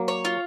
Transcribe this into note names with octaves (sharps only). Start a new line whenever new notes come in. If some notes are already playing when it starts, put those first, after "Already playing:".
Already playing: F#3 A#3
C#5
F4